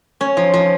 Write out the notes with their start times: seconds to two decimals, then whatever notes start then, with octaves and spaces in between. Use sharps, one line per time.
0.21 C#4
0.37 F3
0.54 F3